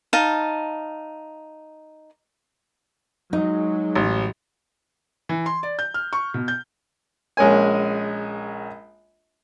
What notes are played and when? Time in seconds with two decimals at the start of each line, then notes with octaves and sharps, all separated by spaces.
0.13 D#4 F5 A5
3.33 F#3 G#3 D#4
3.95 A1
5.29 E3
5.46 C6
5.63 D5
5.79 G6
5.94 F6
6.13 C#6
6.34 B2
6.48 G6
7.37 A#1 G#3 C#4 G#5